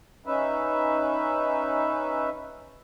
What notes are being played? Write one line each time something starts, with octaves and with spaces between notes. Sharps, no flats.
C#4 D#4 B4 E5